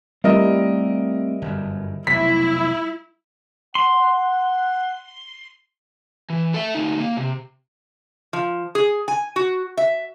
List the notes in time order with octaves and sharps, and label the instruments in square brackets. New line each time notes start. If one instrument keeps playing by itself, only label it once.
[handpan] G3 [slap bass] A3 C4 [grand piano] E4 A#4 D#5
[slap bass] G1 F#2
[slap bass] F1 B1 [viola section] E4 [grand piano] B6
[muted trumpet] F#5 [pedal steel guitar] C6
[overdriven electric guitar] E3
A4 E5
D2 D#4
A#3
C3
[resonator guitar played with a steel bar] F3
G#4
G#5
F#4
E5